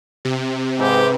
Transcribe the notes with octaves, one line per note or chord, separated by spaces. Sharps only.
C3
G#2 D#4 G4 B4 E5